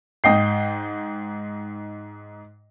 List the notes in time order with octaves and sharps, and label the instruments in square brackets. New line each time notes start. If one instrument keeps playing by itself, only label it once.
[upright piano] G#2 D#5 G5 C7